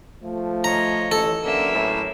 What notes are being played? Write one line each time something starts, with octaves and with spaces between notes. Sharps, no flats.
F3 A3
C#5 D#5 A#5
A1 A4
D3 F#3 A#3 C#4 B4 E5
A2